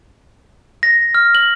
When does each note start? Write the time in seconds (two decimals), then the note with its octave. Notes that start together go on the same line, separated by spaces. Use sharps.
0.83 A#6
1.15 F6
1.35 F#7